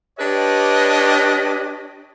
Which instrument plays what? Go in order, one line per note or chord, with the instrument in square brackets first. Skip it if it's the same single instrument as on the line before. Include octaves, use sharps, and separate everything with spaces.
[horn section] D4 G4 B4 C#5 D#5